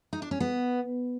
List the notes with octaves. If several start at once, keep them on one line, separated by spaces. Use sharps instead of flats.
D#4
D4
C#4
B3